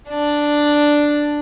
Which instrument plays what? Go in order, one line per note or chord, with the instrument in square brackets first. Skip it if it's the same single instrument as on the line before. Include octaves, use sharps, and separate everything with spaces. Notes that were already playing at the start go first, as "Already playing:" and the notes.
[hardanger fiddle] D4